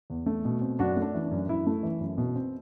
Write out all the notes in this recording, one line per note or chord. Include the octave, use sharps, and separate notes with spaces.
E2
A3
B2
C4
F#2 D4 F#4
A3
D4
E3
D4
F#2
F#2 E4
A3
E3
F#2
B2
C4